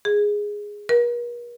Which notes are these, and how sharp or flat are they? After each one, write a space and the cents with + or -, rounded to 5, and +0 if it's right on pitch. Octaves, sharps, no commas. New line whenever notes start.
G#4 -5
A#4 +45